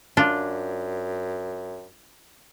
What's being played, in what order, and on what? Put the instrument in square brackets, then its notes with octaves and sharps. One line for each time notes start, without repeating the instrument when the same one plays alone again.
[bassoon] F#2 [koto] D4 F4